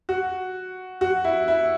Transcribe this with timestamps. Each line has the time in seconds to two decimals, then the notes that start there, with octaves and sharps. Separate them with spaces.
0.09 F#4
1.01 F#4
1.24 E4
1.48 E4